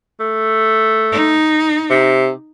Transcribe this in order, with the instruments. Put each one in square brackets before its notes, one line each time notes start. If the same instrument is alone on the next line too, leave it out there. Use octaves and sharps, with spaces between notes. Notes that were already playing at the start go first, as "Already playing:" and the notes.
[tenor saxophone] A3
[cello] D#4
[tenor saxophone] C3